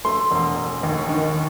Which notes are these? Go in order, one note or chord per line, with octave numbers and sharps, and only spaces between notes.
A3 C6
E1
E1
D#2
D#3